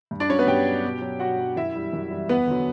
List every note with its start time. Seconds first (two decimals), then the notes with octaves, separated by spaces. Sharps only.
0.11 G2
0.20 D4 D5
0.29 F#3 C#4 C#5
0.39 B3 B4
0.47 G2 G4 G5
0.66 F#3
0.84 B2
1.02 F#3
1.20 B2 F#4 F#5
1.39 F#3
1.56 F#2 E4 E5
1.75 E3 G3
1.93 F#2
2.11 E3 G3
2.29 E2 B3 B4
2.47 D3 F#3